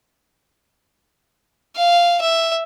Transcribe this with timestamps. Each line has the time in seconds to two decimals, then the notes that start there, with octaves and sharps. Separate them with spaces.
1.76 F5
2.21 E5